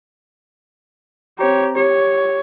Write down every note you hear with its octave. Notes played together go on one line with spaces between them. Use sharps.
C4 G4 C5 C#5 A#5
G4 C#5